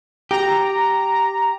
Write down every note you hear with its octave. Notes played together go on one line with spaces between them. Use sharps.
G4 A#5